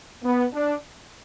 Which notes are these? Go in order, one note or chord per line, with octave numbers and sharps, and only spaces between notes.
B3
D4